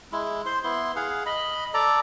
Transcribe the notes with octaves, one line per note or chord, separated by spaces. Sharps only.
G#3 E4
C5 C6
B3 E4 C6
G#4 F5 F#5
D#5 B5
A4 D5 A#5